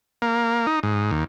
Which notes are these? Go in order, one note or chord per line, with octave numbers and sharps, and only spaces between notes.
A#3
D#4
G#2
D#2